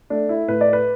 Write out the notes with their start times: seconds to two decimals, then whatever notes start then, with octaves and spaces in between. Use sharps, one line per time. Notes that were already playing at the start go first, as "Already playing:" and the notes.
0.10 A3 D4
0.29 E4
0.48 A2 B4
0.61 D5
0.73 B4